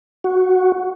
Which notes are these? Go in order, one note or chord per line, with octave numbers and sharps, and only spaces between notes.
F#4